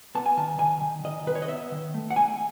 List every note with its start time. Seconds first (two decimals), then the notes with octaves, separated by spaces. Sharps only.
0.15 B3 A5
0.26 G#5
0.37 D#3 A5
0.59 D#3 G#5
0.81 D#3
1.04 D#3 D#5
1.26 D#3 B4
1.35 C#5
1.42 D#5
1.48 B3 E5
1.72 D#3
1.94 A3
2.11 F#5
2.16 A3 G#5